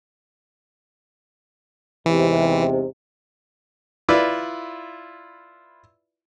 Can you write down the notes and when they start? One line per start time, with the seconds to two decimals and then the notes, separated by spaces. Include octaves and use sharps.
2.06 E2 G#2 C3 E3
4.09 E4 F4 B4 D5